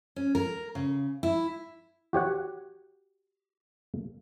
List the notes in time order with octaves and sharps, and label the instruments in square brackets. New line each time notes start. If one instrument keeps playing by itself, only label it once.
[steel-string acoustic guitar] C#4
A#4
C#3
E4
[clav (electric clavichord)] F#4 G4 C#5 F#5